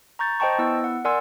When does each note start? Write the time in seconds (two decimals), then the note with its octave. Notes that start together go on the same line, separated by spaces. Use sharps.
0.19 A#5 C#6 G6 A6
0.40 C5 D#5 G5 A5 C#6
0.59 B3 E4 E6
0.84 F#5
1.05 A#4 D5 F#5 G#5 C6 E6